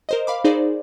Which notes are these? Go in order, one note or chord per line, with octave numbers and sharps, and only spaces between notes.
A#4 C5 D#5
F5 B5 D6
D#4 G#4 C5 D5